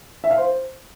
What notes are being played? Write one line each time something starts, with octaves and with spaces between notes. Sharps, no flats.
E5
F5
C5